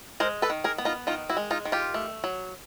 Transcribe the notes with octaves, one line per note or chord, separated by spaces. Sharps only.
G#3 A#4 C5
A4 B4
D#3
G#4 A#4
B3
D#4 F4
D#3 D#4 F4
E4 F#4
G#3
D#4 F4
D#3
F4 G4
A3
F#3